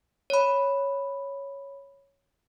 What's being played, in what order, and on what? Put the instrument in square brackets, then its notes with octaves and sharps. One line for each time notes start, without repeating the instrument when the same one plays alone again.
[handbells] C#5 B5